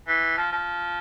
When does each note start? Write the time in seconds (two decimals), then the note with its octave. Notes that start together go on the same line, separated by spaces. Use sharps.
0.08 E3
0.37 F3
0.52 F3